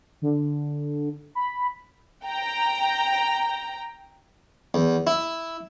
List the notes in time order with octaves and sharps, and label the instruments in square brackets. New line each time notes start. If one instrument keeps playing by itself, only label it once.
[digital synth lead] D3
B5
[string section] G5 A#5
[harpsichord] E2
E4